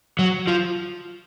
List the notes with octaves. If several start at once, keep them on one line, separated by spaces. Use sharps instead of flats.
F#3
F3